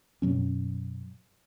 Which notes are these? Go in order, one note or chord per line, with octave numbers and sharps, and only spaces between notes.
F#2 B2 F#3 C#4